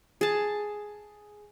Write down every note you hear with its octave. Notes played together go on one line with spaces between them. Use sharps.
G#4 A5